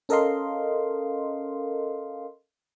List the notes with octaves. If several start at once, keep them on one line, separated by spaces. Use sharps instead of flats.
C#4 A4 A#4 D#5 F5 C6